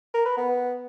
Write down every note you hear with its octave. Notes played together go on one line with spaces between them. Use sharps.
A#4
B4
B3